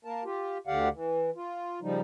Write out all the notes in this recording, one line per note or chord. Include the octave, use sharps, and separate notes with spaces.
A#3 A#4 A5
F4 G4
D2 D3 G4 D5 F5 F#5
E3
F4
C#3 F3 G3 D#4